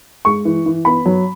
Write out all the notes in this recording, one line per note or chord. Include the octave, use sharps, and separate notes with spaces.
G#3 C#6
E3
E3
B3 B5
F#3